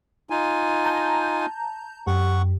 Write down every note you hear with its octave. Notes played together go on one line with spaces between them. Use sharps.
D#4 F4 G#5
A5 A#5 G6
F#2 G4 F#5 C#6